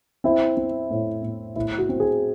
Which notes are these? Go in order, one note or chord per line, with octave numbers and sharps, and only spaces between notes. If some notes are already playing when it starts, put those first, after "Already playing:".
C4 E4
C4
A2
A2
A2 E4
F#4
C4
G#4